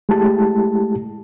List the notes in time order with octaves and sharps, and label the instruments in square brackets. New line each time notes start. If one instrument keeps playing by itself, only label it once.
[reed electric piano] G#3 A3 E4 G4 A5